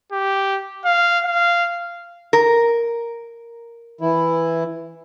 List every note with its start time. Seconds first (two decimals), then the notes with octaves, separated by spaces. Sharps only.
0.12 G4
0.85 F5
1.24 F5
2.33 A#4
4.01 E3 E4